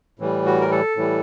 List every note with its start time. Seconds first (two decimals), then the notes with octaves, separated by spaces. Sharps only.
0.19 A2 E3 G3
0.46 F#4
0.61 A#4
0.71 A4
0.96 A2 E3 G3